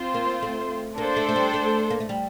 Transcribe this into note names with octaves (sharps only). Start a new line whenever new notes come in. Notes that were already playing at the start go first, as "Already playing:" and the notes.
Already playing: C4 F4 C5
A#3
A3
A#3 D4 A4 C5
A3
A3
G3
A3
A#3
A3
G3